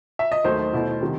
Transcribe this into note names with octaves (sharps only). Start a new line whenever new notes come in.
E5
D#5
D#2 D#3 F#3 A3 C5
B2 A3 E4
C3 D#3 G3